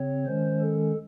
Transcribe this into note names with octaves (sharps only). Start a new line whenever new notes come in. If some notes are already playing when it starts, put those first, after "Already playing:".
Already playing: C#3 C4 C#5
D#3 G#3 C#4 C5
A4